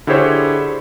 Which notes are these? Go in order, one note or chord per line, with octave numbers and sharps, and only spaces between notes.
D3 E4 G4 G#4 C5 C#5